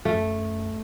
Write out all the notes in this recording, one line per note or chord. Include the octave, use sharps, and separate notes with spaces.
F#2 A3